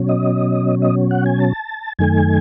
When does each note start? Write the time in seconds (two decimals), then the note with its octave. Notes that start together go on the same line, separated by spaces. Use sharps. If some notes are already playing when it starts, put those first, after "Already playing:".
Already playing: B2 F#3 C#4
0.09 D#5
0.82 D#5
1.11 F#5
1.26 G#5
1.40 A5
1.99 F#2 D#3 A3 G#5